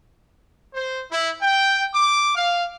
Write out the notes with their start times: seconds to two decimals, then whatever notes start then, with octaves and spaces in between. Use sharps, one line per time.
0.74 C5
1.11 E4
1.42 G5
1.95 D6
2.36 F5